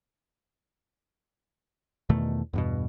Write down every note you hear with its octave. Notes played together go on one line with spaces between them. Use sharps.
E2 B2 D#3 A3
E2 G2 B2